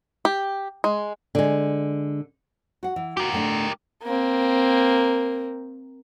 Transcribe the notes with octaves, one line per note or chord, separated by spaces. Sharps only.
G4
G#3
D3 G#3
F#4 F#5
E3
F#4 G4 A#4
A2 A3 D4
A#3 C4